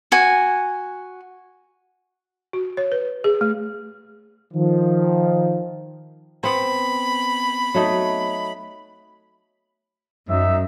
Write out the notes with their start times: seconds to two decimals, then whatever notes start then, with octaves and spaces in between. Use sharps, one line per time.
0.12 F#4 G#5
2.53 F#4
2.77 C#5
2.92 B4
3.24 G#4
3.41 A3
4.54 D#3 F3
6.44 B3 C4 B5
7.74 F#3 A3 D#4
10.29 F#2 D#4 E5